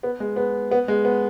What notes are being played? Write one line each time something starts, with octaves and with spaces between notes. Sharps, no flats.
B3
G#3
B3
B3
G#3
B3